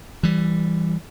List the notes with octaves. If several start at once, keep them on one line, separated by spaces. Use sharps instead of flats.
E3 G3